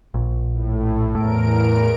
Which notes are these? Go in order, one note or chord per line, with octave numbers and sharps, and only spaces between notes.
A#1
A2
E2 A2 A#4 D7